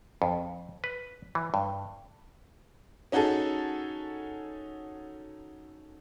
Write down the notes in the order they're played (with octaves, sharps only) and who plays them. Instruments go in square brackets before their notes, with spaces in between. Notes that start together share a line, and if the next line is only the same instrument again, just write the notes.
[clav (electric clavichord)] F2
B4
E3
G2
[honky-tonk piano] C#4 D#4 F#4 G#4 A4